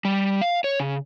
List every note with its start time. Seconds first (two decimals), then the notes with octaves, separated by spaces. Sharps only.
0.05 G3
0.41 F5
0.64 C#5
0.80 C#3